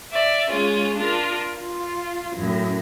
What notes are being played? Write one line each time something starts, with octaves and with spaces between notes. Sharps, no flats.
D5 E5
G#3 C#4 F4
D4 F4 A#4
F4
F#2 A2